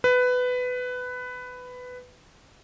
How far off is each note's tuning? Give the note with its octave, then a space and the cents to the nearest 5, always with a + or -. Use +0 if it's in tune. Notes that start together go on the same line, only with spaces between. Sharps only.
B4 +15